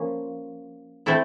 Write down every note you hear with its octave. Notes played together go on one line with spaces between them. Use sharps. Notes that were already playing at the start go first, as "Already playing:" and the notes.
Already playing: F3 A#3 C#4
A3 C4 E4 A4